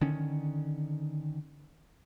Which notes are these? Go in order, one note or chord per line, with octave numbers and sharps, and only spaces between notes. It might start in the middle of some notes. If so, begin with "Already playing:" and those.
D3 D#3 C#4